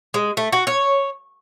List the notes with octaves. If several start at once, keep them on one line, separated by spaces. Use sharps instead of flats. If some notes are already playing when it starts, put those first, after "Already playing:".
G#3
A3
F#4
C#5